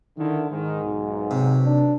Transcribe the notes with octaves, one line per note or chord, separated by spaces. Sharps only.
D3 D#3 E4
G#2 D#3
B1
C3
D4